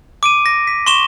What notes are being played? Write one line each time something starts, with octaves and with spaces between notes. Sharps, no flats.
D6 D7 D#7
A#6
B6
C6 C#6 E7 G7